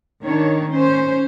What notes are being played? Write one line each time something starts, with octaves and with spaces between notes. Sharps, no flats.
D#3 D4 C#5
C#4 C5